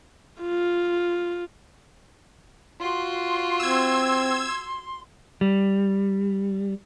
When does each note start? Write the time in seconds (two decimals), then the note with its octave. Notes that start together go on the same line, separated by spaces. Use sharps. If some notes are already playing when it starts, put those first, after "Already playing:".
0.42 F4
2.80 F4 F#4 C6
3.60 C4 E6 G#6
5.41 G3